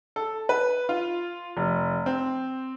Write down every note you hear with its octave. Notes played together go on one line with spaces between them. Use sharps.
A4
B4
F4
F1
C4